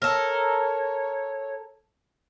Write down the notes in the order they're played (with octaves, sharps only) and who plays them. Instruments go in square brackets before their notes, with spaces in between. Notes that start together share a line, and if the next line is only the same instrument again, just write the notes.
[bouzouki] A4 A#4 [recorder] C#5